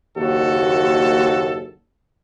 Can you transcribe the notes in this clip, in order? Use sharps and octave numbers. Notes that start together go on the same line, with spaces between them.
F#1 D#2 F#4 A4